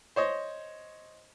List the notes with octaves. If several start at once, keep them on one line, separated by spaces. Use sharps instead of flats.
C5 C#5 D#5